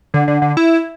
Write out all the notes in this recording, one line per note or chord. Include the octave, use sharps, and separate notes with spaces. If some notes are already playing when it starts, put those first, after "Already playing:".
D3
D3
D3
E4